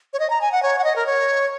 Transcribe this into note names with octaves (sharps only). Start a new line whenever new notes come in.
C#5
D#5
A#5
G#5
F#5
C#5
F#5
D#5
A#4
C#5